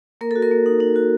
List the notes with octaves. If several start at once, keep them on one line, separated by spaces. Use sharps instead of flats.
A#3 A#4
F#4 A4
A#4
A#3
D#4
D#4
F#4